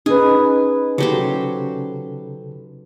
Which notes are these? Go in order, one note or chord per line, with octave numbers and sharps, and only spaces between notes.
C#4 D#4 G#4 B4
C#3 F#3 G4 A4 C5